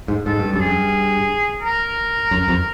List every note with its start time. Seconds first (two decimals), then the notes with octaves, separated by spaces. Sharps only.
0.08 G#2
0.26 G#2 A4
0.39 G2
0.52 F#2 A4
0.60 G#4
0.67 G2
1.62 A#4
2.31 F#2
2.48 F2